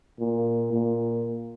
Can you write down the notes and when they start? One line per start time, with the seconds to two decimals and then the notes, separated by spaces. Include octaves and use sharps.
0.20 A#2
0.73 A#2